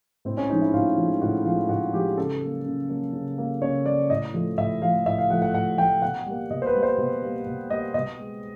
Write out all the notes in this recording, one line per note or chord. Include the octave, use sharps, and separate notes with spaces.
A2 C4
C#4
F3 G#3 D#4
E4
A2 F4
F3 G#3
A2 F#4
F3 G#3 F4
A2 F#4
F3 G#3 G4
C#3 A4
F#3 A#3
C#3
F#3 A#3
C#3
F#3 A#3
C#3 C#5
F#3 A#3 D5
A2 D#5
F3 A3
A2 E5
F3 A3 F5
A2 E5
F5
F3 A3 F#5
F#5
A2 F#5
F3 A3 G5
B2 F#5
G3 A#3
B2 D#5
C5
B4
G3 A#3
C5
B2
G3 A#3
B2
G3 A#3 D#5
B2 D#5
G#3